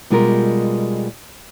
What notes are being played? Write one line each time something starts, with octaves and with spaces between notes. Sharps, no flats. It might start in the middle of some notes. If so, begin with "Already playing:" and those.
B2 G3 G#3 F4 G4 A#4